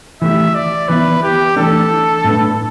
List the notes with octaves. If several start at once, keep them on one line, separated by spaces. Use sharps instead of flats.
E3 A3 G4 E5
D5
E3 B3 E4 B4
G4
E3 A3 D4 A4
A2 A3 D4 B4